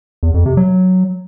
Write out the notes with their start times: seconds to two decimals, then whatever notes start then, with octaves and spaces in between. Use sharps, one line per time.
0.23 E2
0.34 F2
0.46 C3
0.57 F#3